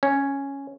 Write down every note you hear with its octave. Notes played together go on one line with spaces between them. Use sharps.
C#4